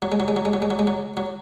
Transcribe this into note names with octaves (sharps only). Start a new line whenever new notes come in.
F#3
G#3
F#3
G#3
F#3
G#3
F#3
G#3
F#3
G#3
F#3
F#3